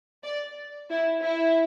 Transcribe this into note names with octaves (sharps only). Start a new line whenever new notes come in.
D5
E4
E4